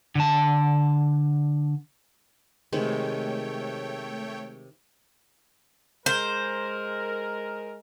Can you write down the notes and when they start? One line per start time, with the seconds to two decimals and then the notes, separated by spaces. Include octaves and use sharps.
0.15 D3 A5
2.73 C3 D#3 G#3 A3 C#5 G5
6.06 G#3 A#4 C5